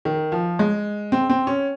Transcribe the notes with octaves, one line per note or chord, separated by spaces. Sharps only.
D#3
F3
G#3
C4
C4
C#4